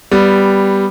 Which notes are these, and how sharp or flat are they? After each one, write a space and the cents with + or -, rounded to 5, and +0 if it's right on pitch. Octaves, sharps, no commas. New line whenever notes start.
G3 +0 B3 +0